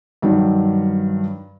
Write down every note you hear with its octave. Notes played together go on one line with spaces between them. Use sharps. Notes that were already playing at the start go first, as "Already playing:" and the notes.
G2 D#3 F#3